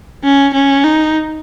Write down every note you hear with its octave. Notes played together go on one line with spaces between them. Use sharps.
C#4
C#4
D#4